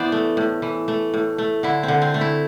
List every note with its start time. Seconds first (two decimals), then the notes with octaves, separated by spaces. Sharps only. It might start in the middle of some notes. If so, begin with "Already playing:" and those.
Already playing: E3 B3 C5 D5
0.12 A3
0.37 A2
0.62 E3
0.88 A3
1.14 A2
1.38 A3
1.63 D3 E4
1.83 C4
1.88 D3
2.02 C4
2.14 A3
2.21 E4